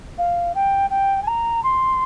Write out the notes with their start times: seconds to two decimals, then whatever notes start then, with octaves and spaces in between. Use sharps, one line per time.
0.18 F5
0.54 G5
0.90 G5
1.22 G#5
1.27 A#5
1.63 C6